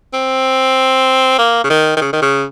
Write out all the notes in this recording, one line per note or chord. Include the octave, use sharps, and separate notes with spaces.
C4
A#3
C#3
D#3
D#3
C#3
D#3
C#3